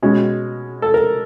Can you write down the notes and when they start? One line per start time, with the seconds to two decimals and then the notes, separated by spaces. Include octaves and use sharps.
0.03 B2 G#3 C#4
0.82 A4
0.94 A#4